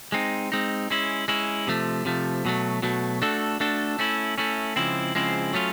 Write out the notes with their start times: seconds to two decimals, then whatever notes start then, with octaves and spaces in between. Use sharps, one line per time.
0.12 G#3 C4 D#4
0.52 G#3 C4 D#4
0.90 G#3 C#4 E4
1.28 G#3 C#4 E4
1.67 C3 F3 A3
2.05 C3 F3 A3
2.45 B2 F#3 A3
2.82 B2 F#3 A3
3.22 A3 D4 F#4 A4
3.60 A3 D4 F#4 A4
3.99 A3 C#4 E4
4.38 A3 C#4 E4
4.76 C#3 F3 G#3 C4 E4
5.15 C#3 F3 G#3 C4 E4
5.53 F#3 A3 C#4 F4